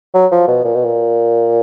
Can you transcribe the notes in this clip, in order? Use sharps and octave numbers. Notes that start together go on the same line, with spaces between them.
F#3
F3
B2
A#2
B2
A#2